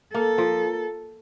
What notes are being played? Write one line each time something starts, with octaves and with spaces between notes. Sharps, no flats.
A#3 A4
F3